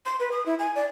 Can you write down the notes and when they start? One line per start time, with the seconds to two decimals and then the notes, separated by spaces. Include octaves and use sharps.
0.06 C6
0.20 B4
0.32 D#6
0.46 E4
0.59 G#5
0.76 D5